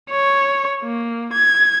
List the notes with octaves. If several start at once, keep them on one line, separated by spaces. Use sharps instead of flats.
C#5
A#3
G#6